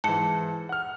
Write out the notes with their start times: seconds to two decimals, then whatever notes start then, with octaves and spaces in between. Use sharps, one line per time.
0.04 G#2 E3 A5 C#7
0.69 F#5 F6